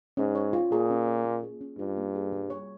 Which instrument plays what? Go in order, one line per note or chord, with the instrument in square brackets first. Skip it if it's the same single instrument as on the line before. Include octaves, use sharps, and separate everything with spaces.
[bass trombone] G#2 [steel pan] C#4
[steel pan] C#5
F4
[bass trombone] A#2 [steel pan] G#4
[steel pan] C#4
C#5
A#3
G#4
C#4
[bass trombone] G2 [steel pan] F4
[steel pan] A#3
G#4
G3
C#5